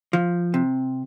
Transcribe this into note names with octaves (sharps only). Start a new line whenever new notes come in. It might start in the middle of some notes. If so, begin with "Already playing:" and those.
F3
C3